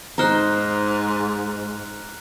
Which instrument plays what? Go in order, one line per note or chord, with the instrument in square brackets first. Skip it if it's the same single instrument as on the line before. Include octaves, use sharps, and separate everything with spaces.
[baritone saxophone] G#2 [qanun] D#4 C5 [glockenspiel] A#5 F6 F#6